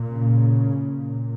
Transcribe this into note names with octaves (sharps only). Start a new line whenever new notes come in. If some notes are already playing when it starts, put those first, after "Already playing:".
Already playing: A#2
C#3
A#2